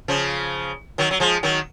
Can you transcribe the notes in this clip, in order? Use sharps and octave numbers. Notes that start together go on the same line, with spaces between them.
C#3 F3
D#3 F#3
F#3
F3 G#3
D#3 F#3